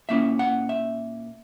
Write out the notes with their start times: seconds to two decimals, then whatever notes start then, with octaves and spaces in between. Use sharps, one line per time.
0.09 A#2 A#3 C#4 E4 E5
0.39 F#5
0.69 E5